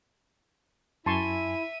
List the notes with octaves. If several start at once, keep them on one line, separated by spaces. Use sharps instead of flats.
F#2 E4 E5 G#5 A5 C6 C#6 D#7